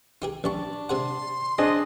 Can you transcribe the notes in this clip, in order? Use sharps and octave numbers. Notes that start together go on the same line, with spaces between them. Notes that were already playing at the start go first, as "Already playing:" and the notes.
D#4 G4 G#4
A1 D4 G4 C#6
C3 G#4 F#5 C6
C4 D4 G#4 D#5